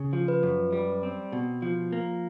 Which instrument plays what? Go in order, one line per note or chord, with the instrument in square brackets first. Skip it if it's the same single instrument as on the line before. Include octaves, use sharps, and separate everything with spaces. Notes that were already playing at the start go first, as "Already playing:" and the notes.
Already playing: [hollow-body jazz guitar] C#3
F3
[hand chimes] B4
[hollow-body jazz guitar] F#2
G3
C4
B2
F3
A#3